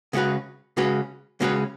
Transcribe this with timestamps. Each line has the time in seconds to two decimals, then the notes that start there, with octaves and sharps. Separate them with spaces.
0.13 C#3 G#3 C#4 F#4 B4
0.77 C#3 G#3 C#4 F#4 B4
1.41 C#3 G#3 C#4 F#4 B4